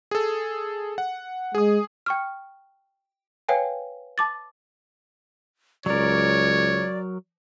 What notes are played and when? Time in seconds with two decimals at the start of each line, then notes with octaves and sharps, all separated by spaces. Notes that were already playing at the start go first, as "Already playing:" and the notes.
0.11 G#4 A4
0.98 F#5
1.55 G#3 G#4 D#6
2.06 G5 C#6 F6
3.49 B4 C#5 F5 G5 G#5
4.18 A5 D6 A6
5.86 C#2 F#3 A#4 C#5 D5